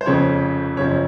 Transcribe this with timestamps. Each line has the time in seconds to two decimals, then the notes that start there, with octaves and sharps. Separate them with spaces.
0.01 C5
0.06 F1 F2 C#3 F3 C#5
0.77 F#1 F#2 F3 C#5